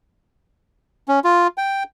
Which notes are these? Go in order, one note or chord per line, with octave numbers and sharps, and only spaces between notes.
C#4
F4
G5